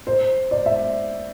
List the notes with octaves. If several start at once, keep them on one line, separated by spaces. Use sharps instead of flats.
C5
D5
E5